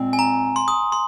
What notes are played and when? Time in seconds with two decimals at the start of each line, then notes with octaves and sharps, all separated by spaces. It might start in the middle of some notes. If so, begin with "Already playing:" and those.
Already playing: A#2 G#3 C4
0.13 G#5
0.19 A#5
0.56 C6
0.68 D#6
0.92 C6